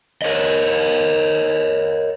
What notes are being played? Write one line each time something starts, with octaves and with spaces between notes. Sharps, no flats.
A#4 C#5 D#5